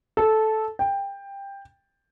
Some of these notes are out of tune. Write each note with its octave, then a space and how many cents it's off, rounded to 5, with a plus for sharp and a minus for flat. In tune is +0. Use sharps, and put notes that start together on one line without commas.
A4 -10
G5 +15